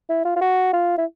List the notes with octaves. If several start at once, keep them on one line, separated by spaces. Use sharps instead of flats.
E4
F4
F4
F#4
F4
E4